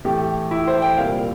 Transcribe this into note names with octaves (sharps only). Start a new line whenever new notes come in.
A2 E3 A3 G4
E4
C5
G5
C2 A#2 G3 A#3 F5